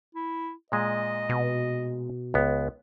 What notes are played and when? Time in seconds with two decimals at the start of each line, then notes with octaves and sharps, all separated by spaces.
0.15 E4
0.72 A#2 G#3 D#5
1.29 B2
2.34 C#2 B3